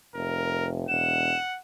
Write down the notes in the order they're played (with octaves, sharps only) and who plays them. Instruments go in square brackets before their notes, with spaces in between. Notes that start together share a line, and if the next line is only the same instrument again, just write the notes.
[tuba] F1 [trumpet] A#4
[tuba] E1 [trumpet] F#5 [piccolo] E7